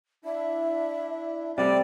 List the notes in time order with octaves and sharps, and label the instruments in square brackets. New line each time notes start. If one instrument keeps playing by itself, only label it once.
[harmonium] D4 E4 [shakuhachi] E5
[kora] C3 G3 [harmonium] A3 C4 [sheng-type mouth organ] D5